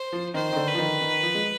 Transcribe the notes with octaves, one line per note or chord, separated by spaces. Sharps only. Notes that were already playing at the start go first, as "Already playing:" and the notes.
Already playing: C5
F3
D#3 C5
D#3
D3
B4
F3
D#3
D#3
F3
G#3